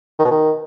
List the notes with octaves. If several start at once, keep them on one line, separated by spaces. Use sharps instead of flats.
D#3
B2
D#3